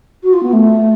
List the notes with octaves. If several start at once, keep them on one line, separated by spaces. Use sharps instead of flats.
F#4
F4
B3
A3